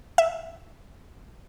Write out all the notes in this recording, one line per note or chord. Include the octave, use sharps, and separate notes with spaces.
E5